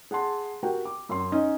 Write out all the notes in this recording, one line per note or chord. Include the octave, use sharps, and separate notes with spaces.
G#4 F#5 A5 C6
F#4 G4 A#4 F#5 G5
D6
F#2 C6
C#4 D#4 D#5